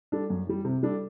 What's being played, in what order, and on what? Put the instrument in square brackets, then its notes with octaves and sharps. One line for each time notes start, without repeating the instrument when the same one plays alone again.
[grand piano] G3 D4 A4
F#2
E3 G3
C3
G3 D4 A4